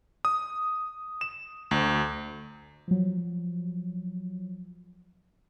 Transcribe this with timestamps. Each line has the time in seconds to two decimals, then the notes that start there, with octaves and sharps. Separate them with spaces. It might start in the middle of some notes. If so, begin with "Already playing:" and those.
0.25 D#6
1.21 E7
1.71 D2
2.88 F3 F#3